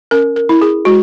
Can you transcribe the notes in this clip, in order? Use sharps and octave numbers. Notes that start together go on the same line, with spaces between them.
C#4 A#4
A#4
E4
G#4
G#3 F#4